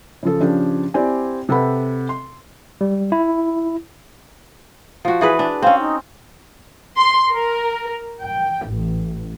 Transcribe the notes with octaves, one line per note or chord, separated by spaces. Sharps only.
C#3 F3 A4
C#3 F3 D4 G4
C4 E4 G4 D5 G#5
C3 A4 B4 F#5 B5
C6
G3
E4
F3 F#4
E3 G#4 B4
D4
C4 C#4 F5
D#4
C6
A#4
G5
A1